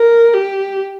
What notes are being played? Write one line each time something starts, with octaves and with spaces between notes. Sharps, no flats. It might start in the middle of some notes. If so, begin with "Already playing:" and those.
Already playing: A#4
G4